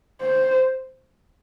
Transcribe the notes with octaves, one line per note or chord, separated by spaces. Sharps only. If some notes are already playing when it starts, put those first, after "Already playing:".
C5